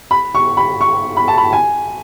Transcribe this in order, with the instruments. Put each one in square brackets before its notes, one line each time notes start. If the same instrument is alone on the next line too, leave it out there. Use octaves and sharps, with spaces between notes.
[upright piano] B5
C#6
B5
C#6
B5
A5
B5
G#5